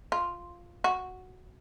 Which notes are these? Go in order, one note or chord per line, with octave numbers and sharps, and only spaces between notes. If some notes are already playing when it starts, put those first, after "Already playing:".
F4
F#4